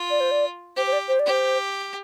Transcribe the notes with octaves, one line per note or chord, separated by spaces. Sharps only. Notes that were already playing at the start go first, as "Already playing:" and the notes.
Already playing: F4
D5
C5
D5
G4 C5
C5
D5
C5
D5
G4 C5